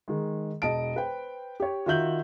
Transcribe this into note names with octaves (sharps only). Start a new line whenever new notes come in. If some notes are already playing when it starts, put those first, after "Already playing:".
D#3 G#3
E1 D#5 A5 D7
B4 C5 G5
G4 C#5
D#3 F4 F#4 E5 G6 F#7